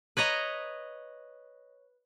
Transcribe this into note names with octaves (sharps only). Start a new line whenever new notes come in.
B4 C#5 D#5 A#5